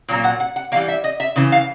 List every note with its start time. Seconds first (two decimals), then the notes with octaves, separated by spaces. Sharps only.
0.08 A#2 F#3 A#3
0.24 F#5
0.40 F#5
0.56 F#5
0.72 E3 G3 A#3 F5
0.88 E5
1.04 D#5
1.20 E5
1.36 C#3 E3
1.52 F5